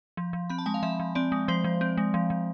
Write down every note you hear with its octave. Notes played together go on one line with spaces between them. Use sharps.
F3
F3
C4 B5
A5
G#3 G#5
F5
F3 E5
F3
C4 D5
G#3
F3 C5
F3
C4
G#3
F3
F3